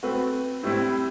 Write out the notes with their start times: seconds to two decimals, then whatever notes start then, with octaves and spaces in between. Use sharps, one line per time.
0.03 A3 C4 F#4 B4
0.63 A2 G3 C4 E4